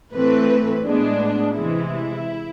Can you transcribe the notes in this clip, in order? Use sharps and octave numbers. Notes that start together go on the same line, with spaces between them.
A2 E3 A3 C4 B4
A2 G#3 B3 D4
C3 E3 G#3 E4